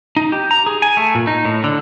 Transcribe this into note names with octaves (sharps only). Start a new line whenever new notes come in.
D#4
G4
A#5
G#4
G#5
A3
A#2
D#4
A2
D3